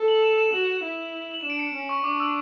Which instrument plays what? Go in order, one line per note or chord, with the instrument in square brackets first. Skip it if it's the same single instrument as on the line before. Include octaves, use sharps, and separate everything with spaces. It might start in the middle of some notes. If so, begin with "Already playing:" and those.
Already playing: [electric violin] A4
[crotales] F#7
E7
E7
[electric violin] F#4 [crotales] F#7
[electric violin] E4
[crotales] F#7
[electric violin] D4 [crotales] E7
[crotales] D7
C#7
[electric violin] C#4
[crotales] C#6
[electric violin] D4 [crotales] D6
[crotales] E6